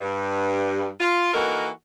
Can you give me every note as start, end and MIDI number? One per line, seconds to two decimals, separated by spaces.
0.01 0.87 43
1.00 1.33 65
1.34 1.69 52
1.34 1.69 58
1.34 1.69 63
1.34 1.69 66
1.34 1.69 69
1.34 1.69 70